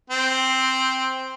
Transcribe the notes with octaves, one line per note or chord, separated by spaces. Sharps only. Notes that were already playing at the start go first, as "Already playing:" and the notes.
C4